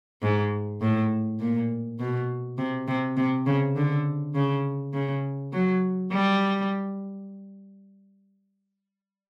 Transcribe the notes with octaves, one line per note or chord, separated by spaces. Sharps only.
G#2
A2
A#2
B2
C3
C3
C3
C#3
D3
C#3
C#3
F#3
G3